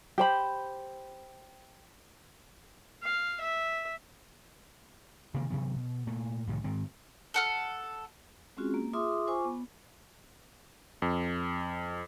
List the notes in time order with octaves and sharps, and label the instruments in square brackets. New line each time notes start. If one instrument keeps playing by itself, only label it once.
[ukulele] G4 C5 B5
[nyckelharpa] F5
E5
[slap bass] C3 D#3 A#3
C3 E3 F#3 B3
B2
A#2 A3
C2 A2 D#3
G#2 D#3 C4
[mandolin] A4 F#5 F6
[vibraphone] G#3 C4 C#4 F4 F#4 G#4
A#3
F4 G#4 E5 C6 D6 D#6
F4 C5 G#5 C#6 D6
B3
[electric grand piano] F2